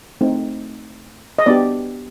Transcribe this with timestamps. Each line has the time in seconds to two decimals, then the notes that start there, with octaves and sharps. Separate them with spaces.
0.21 A3 C4 D#4
1.39 D#5
1.46 B3 D4 G4 D5